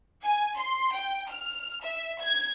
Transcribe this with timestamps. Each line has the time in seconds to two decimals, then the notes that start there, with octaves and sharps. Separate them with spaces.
0.24 G#5
0.58 C6
0.94 G5
1.29 F6
1.84 E5
2.22 G#6